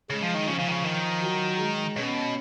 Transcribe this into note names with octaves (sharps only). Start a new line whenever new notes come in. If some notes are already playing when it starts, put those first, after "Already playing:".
C#3 G#3
F3
D#3
C#3 F3
C#3
D#3
C#3
D#3
F#3
G#3
B2 C#4